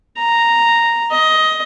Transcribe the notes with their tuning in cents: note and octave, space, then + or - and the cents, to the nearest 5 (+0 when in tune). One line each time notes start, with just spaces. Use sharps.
A#5 -5
D#5 +15